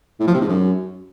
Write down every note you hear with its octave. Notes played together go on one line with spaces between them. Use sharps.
A2
F3
C3
G#2
F#2